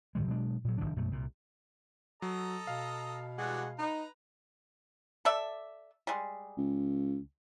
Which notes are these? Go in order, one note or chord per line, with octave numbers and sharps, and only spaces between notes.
G#2 D3 D#3 G#3
B2 F#3 G#3 D4
A#2 F#3
F1 E2 D#3 D4
A#1 F#2 B2 A3
C2 A#2
F#3 A4 D#5 A#5
B2 F5
E3 G3 G#3 F#4 D5 F#5
D#4 B4 A#5
A4 D5 E5
G3 G#3
C#2